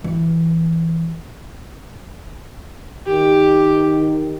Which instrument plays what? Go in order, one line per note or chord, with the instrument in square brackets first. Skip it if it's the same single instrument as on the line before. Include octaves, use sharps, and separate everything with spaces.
[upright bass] E3
[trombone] D#3 [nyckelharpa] G4